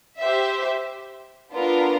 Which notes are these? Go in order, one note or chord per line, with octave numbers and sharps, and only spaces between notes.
G4 C5 E5
B3 D4 F4 A#4